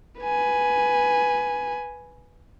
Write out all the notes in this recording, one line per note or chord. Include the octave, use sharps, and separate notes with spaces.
B4 G#5